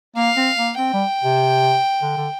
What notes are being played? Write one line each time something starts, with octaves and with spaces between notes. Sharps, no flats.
A#3 F5
C4
A#3
C4 G5
G3
C3
D3
D3